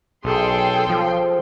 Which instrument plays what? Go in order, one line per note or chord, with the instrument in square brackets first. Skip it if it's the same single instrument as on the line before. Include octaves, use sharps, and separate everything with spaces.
[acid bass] B1 [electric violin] G#4 A4 [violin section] G5 C6
[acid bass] F3